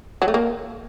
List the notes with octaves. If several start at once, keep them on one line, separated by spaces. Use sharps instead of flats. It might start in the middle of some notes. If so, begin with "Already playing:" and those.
F#3
A3
A#3